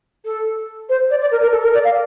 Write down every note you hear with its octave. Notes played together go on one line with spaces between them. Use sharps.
A4
C5
D5
D5
A#4
A#4
A4
A#4
D5
F5